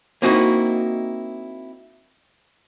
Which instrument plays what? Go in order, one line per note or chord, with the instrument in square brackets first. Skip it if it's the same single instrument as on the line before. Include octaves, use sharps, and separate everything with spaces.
[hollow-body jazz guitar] A#3 C4 D#4 E4 F#4